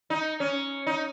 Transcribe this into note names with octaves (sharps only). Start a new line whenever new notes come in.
D#4
C#4
D#4